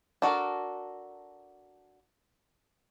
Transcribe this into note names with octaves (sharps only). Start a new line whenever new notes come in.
D4 F#4 A4 A#4